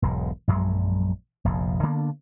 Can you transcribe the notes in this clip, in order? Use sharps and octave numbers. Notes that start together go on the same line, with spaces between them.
E1 B1 G#2
A#1 F#2 F#3 G#3
F1 A#1 F2
D3 A#3 B3 D4